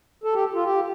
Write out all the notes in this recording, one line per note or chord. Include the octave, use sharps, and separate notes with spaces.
A4
G4
F4
G4